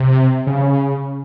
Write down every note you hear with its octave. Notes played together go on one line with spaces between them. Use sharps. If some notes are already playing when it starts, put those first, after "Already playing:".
Already playing: C3
C#3